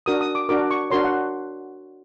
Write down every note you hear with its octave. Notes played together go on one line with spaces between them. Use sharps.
D4 F#4 A#4 D#6
D#6
D6
D4 F#4 A#4 D6
C#6
D4 F#4 A#4 C#5 C6
F#5